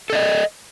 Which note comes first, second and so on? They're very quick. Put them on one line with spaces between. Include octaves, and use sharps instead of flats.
A4 D5 D#5